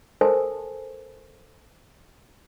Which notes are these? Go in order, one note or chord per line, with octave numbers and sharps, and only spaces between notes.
A4 A#4 C5 G#5 A5